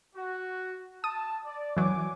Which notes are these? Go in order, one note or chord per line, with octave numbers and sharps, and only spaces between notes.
F#4
A5 D#6
D5
E3 F#3 C#5 G#5 D6